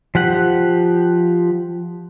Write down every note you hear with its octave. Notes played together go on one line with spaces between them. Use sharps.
F3 G4 F#5